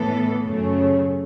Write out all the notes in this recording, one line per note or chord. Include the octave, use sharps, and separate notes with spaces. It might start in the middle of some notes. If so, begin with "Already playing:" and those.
Already playing: A2 E3 B3 A4
F#2 C#3 A3 C#4